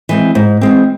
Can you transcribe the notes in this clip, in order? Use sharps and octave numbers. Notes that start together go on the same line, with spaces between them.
E3 G#3 C4
G#2
E3 G#3 C4